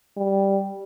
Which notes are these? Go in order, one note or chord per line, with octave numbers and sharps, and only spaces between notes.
G3